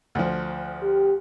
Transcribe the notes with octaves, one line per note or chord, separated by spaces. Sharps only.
D2 F3
G4